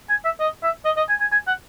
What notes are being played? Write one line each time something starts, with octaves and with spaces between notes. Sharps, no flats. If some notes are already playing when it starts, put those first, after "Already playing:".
G#5
E5
D#5
E5
D#5
D#5
G#5
G#5
G#5
F#5